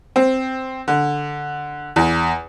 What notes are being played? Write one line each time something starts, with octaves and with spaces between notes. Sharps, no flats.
C4
D3
E2